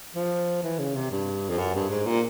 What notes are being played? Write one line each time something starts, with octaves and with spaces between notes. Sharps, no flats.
F3
E3
C#3
C3
G2
F2
F#2
G2
G#2
A#2